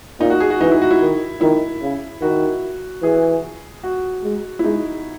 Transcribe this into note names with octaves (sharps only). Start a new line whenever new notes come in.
A#2 D#4
F#4
G#4
F#4
E3 D#4
E4
F#4
E4
D#3
D#3 E4
C#3
D#3 F#4
E3 G#4
F#4
G#3
E4
G#3 D#4